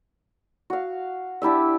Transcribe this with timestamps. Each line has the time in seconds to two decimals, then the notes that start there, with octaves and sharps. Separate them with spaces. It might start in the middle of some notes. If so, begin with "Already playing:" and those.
0.70 F#4 F5
1.42 D4 E4 G4 E5